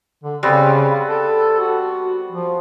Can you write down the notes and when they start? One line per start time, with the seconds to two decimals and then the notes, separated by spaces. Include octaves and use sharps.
0.24 D3
0.43 C#3 G3 B3 C4
1.08 A4
1.59 F#4
2.31 F3